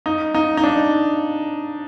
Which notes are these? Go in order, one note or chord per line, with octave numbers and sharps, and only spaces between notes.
D#4
D#4
D#4
D4